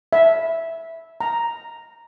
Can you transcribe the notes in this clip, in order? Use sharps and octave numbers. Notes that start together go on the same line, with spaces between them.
E5
A#5